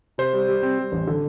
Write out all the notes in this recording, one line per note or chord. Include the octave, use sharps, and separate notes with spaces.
C3 C5
G3
G3
C4
G3
A1
D3